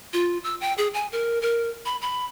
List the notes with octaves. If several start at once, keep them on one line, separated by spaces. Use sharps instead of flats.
F4
E6
G5
G#4
G#5
A#4
A#4
B5
B5